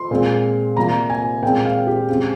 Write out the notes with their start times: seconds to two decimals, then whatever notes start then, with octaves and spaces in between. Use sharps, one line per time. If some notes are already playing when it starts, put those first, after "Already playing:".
Already playing: C6
0.11 A#2 G#3 C4
0.77 C3 G3 A#3 A#5
1.10 G#5
1.43 A#2 G#3 C4 G5
1.65 F5
1.87 G4
2.09 C#3 G#3 C4